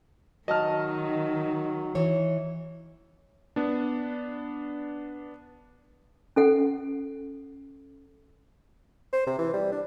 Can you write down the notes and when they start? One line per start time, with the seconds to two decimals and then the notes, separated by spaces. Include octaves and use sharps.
0.48 D#3 F#3 D#5 A5 F6
1.95 E3 C#5
3.56 B3 D4
6.36 C#4 A4 F#5
9.13 C5
9.27 C3
9.39 E3
9.53 G3
9.72 D4